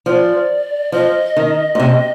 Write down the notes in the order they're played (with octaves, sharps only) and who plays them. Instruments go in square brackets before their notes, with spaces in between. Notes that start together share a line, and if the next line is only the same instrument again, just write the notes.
[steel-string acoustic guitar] F3 [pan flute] D5
[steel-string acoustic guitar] F3 [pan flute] D#5
[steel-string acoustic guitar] D#3
A#2
C3